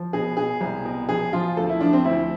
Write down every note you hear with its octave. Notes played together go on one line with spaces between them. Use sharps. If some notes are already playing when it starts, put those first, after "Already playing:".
Already playing: F3
B2 G#4
B2 G#4
C2
B2
F3 G#4
F3 F4
D2 A4
E4
F3 D4
C4
D2 E4